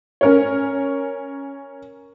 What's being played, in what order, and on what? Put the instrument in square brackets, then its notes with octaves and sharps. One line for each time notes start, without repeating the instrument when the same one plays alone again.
[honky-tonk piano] C#4 A#4 C#5